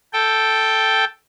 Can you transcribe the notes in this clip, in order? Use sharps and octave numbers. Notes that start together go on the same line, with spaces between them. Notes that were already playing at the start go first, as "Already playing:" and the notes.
A4 G5